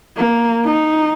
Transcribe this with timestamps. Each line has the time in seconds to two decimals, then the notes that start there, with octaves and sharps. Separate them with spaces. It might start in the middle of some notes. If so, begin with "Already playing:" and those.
0.17 A#3
0.65 D#4